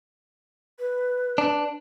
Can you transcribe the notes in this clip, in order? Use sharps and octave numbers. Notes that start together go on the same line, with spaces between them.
B4
D4